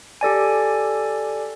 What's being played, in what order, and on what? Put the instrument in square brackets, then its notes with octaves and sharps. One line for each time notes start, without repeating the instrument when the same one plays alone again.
[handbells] G4 A4 D5 G#5